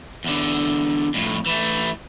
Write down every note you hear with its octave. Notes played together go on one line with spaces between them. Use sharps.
E2 D3
F2 A2
E3 A3